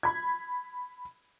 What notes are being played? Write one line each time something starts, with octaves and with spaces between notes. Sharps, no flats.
B5 G#6